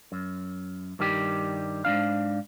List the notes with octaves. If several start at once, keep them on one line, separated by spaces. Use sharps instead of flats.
F#2
G2 D#3 G3 G4
G#2 D#3 D4 F5